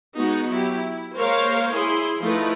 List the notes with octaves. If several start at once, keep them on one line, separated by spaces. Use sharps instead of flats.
G#3 B3 D#4 F#4
F#3 E4 G4
E4
G#3 A#3 A#4 C5 C#5 F5
E4 G#4 C6
F3 A3 D#4 E4 B4